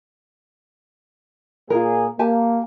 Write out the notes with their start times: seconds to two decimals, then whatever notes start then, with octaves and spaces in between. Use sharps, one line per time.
1.70 A#2 A#3 F4 G#4 A#4
2.19 A#3 G4 G#5 A5